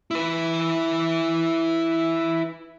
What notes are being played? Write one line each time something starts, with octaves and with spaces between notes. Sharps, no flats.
E4 B4